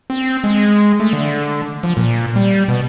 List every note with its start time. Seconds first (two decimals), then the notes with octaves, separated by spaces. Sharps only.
0.10 C4
0.44 G#3
1.00 A3
1.13 D3
1.83 F3
1.97 A#2
2.36 G3
2.68 B2